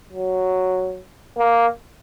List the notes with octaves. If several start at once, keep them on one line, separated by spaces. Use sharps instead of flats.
F#3
A#3